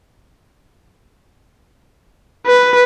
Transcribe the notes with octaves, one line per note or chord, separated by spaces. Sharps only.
B4